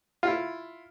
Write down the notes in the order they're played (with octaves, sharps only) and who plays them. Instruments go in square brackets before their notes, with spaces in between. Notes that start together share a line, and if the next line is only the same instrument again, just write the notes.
[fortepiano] E4 F4